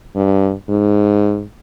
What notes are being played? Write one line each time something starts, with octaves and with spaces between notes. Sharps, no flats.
G2
G#2